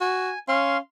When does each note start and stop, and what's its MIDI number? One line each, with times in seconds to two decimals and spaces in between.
0.01 0.31 66
0.01 0.39 80
0.48 0.77 61
0.48 0.77 77
0.48 0.77 84